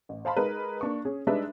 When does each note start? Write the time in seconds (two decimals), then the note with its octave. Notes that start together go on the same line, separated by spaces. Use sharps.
0.09 A1
0.25 C5 F5 A5 B5 C6
0.37 G#3 D#4 G#4 A#4 B4
0.81 A#3 D4 C#6
1.05 C#4 G#4
1.27 G3 G#3 D4 D#4 B4 E5